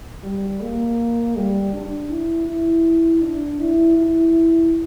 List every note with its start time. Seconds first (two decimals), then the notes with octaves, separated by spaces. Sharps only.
0.24 G3
0.61 A#3
1.36 G3
1.73 D4
2.10 E4
2.47 E4
3.22 D4
3.60 E4
3.97 E4